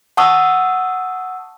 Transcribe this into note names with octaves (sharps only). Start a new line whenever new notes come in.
F#5 A5 C#6 D#6 E6